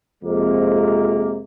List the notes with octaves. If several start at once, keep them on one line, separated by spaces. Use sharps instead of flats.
F2 C3 G#3 A#3